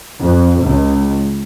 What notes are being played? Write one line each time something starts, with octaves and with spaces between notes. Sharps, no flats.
F2
C#2